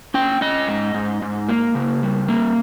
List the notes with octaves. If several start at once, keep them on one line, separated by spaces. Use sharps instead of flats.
C#4 G5
C#4 D#5
G#2
G#2
G#2
A#3
C#3
G3
A#3